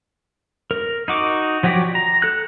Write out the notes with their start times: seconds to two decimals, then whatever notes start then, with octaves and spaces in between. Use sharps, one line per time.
0.71 A#4
1.08 D#4 F#4 D6
1.63 F3 F#3 F#4 G4 D5
1.95 A#5
2.22 A4 F#6